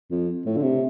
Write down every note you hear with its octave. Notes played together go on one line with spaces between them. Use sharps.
F2
A2
D3
C3